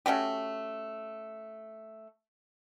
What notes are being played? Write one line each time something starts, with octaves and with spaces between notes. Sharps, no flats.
A3 C#4 F#4 G4